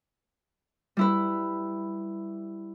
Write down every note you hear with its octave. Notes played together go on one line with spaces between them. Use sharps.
G3 E4 B4